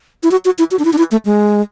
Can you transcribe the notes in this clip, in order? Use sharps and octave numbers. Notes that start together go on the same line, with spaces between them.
E4
F#4
F#4
E4
F#4
D4
E4
D4
E4
A3
G#3